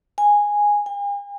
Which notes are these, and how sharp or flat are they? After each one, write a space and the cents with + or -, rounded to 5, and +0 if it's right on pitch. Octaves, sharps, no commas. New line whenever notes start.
G#5 -10
G#5 -45